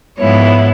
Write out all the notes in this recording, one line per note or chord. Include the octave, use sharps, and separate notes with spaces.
G#2 F3 G#3 B3 E4 C#5